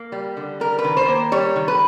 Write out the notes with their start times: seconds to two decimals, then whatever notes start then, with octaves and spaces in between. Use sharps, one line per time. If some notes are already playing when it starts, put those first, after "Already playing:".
Already playing: A#3
0.12 G3
0.37 D3
0.60 G3 A#4
0.78 B4
0.84 D#3
0.97 C5
1.08 A#3
1.32 G3 C#5
1.56 D#3
1.68 B4